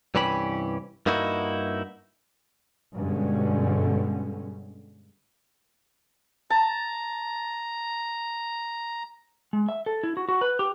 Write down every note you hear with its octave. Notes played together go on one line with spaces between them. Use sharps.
C2 G2 E3 C#4 G4 B5
G2 A#3 D#4 E4 F#4
G2 B2 D3 G3 G#3 C#4
A5 A#5
G#3
E5
A4
E4
F#4
F#4
B4
G4